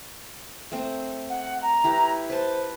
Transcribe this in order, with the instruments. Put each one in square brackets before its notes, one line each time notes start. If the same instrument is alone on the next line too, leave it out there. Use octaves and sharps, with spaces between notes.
[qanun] A3 C4
[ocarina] F#5
A#5
[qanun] E4 G4 B4
[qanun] B4 A5 [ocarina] C5